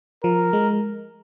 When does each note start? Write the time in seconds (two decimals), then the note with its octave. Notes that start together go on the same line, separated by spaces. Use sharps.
0.24 F3 A#4
0.53 G#3